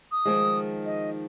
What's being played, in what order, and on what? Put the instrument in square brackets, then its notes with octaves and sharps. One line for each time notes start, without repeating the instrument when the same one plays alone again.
[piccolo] D#6
[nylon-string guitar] D#3 F3 G#3
[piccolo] D#5